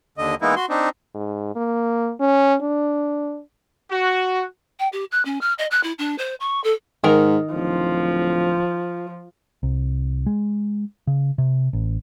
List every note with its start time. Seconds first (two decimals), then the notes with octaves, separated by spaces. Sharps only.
0.18 D#2 D3 D#5
0.42 E3 G#3 A#3 B3 D#4 E4
0.56 F#4 C6
0.70 C4 D4 D#4
1.15 G#2
1.55 A#3
2.20 C#4
2.62 D4
3.91 F#4
4.79 G5
4.93 G4
5.12 F#6
5.25 C#4
5.41 F6
5.59 D#5
5.71 F#6
5.83 E4
5.99 D4
6.18 C5
6.40 C#6
6.64 A4
7.04 G#2 D#3 A#4
7.54 D1 F3
9.63 C2
10.26 G#3
11.07 C#3
11.38 C3
11.73 A1